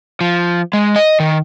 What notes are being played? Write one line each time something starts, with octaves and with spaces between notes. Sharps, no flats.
F3
G#3
D#5
D#3